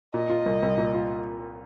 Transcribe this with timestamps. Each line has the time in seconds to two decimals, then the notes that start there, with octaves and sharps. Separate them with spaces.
0.14 A#2 D#5
0.30 F4
0.46 C2
0.63 C2
0.78 A#2
0.94 F4